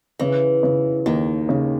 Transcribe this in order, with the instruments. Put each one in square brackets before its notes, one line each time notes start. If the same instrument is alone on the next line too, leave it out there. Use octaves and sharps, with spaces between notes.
[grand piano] C#3 [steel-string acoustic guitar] E3
[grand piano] C#3
[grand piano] D#2 [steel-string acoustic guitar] D#3
[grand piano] C#3